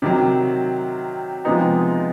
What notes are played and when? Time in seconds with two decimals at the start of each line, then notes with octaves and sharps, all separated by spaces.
0.02 C3 D#3 F#3
1.45 C3 F3 G#3 B3 D#4